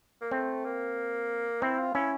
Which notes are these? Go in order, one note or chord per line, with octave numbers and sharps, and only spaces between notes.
A#3
A3 C4
A#3
C4 E4
F4
C#4 E4